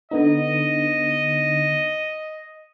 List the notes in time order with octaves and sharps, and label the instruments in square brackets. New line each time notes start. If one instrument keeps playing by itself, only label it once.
[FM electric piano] D3 B3 D#4 [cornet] D#5